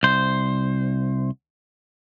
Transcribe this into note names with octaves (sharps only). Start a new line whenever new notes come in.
C2 C5